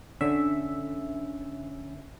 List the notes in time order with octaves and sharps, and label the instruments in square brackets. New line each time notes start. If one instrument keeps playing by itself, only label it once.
[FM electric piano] D3 E5 [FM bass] C#4